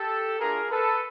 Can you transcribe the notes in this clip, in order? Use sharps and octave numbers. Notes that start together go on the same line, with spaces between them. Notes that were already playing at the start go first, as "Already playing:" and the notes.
Already playing: G4 A4
A3 D4 F4 G#4 A#4
A4 B4